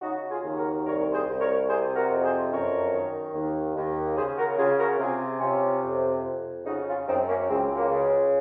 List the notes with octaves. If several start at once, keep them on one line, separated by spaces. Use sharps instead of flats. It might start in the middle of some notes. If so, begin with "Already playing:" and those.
C#3 D#4 F#4
F4 G#4
D#2
F#4 A#4
C2 A#4 C#5
G#4 C5
C2
A#4 C#5
C3 G#4 C5
F#4 A#4
F2
G#4 C5
F#2 A#4 C#5
D#3
D#2
D#2
C#3 G#4 C5
F#4 A#4
C#3 F4 G#4
F#4 A#4
C3 F4 G#4
C3 C#4 F4
F2
F2
C#3 D#4 F#4
C#4 F4
F#2 C4 D#4
A#3 C#4
C#2 G#3 C4
F#3 A#3
C#3
G#3